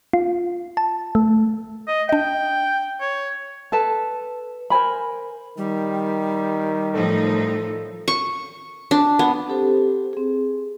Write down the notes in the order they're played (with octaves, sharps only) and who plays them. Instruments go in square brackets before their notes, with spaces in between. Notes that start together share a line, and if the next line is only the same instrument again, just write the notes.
[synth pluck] F4
A5
A3
[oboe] D#5
[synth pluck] D4 D#5 [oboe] G5
[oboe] C#5
[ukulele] A4 B4 A5
A#4 C5 G#5 B5
[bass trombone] D#3 [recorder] G3
[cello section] A2 F3 D#4 [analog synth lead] A4
[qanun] C#6
D4
B3
[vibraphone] C4 G4 A4 C5
C4 G#4